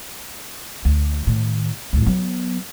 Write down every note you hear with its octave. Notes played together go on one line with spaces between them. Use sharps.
D2
A2 D#3
D2 A2
F#3 B3